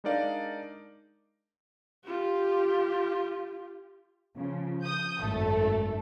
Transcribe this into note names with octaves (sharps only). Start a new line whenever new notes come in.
G#3 D4 D#4 A#4 D5 F5
F4 G4
C#3 F3
D#6 G6
G#1 F#2 A3 A4